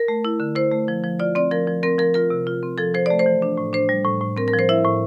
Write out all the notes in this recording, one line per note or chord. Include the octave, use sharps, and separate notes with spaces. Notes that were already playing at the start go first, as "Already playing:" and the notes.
Already playing: A#4
A3
E4
D3
E4 C5
A3
F3
F3
F4 D5
C4 D5
F3 A#4
F3
C4 A#4
F3 A#4
F4 A#4
C3
F4
C4
F3 A4
F3 C5
A3 D5
C5
E3
D4
A2
D4 C5
G3
A2
A2
C4 A#4
A#4
F3
C5
E4 E5
A2